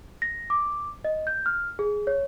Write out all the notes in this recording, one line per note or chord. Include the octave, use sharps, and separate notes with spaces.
A#6
D6
D#5
G6
F6
G#4
C#5